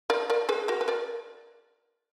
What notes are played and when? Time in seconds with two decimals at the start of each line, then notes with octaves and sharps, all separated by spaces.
0.10 A#4 D5
0.30 A#4 D5
0.49 G#4 B4
0.68 F#4 A#4
0.81 B4
0.88 A#4 D5